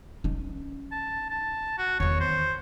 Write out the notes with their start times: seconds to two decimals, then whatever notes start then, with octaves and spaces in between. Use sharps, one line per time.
0.24 C#4 D#4
0.92 A5
1.30 A5
1.78 F#4
2.00 E2 D#3 C#5
2.20 C5